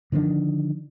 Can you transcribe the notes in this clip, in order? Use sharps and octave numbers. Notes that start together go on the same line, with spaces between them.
D3 D#3 F3 D4